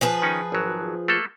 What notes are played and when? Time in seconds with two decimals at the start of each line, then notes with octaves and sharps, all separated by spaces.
0.01 F3 G#4 B4
0.22 D#3 C#4 D#4
0.52 G#1 F#3
1.08 A3 A#3 A4